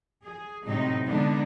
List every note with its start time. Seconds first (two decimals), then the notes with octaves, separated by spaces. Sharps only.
0.23 G#4
0.65 A2 C3 F#3 D#4
1.06 D3 G#3 B3 D4 D#4